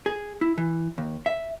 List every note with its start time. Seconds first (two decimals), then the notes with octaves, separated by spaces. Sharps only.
0.06 G#4
0.41 E4
0.58 E3
0.98 D#2
1.26 E5